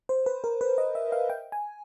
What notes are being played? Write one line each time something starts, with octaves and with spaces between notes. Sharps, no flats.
C5
B4
A#4
B4
D#5
E5
F5
G5
G#5